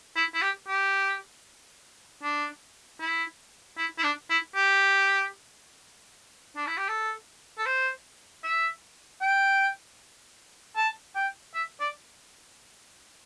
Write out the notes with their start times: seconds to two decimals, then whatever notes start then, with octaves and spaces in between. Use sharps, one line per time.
0.16 E4
0.34 E4
0.42 G4
0.67 G4
2.23 D4
3.00 E4
3.78 E4
3.98 E4
4.03 D4
4.30 E4
4.55 G4
6.56 D4
6.67 E4
6.77 G4
6.89 A4
7.58 A4
7.66 C5
8.44 E5
9.21 G5
10.76 A5
11.15 G5
11.54 E5
11.80 D5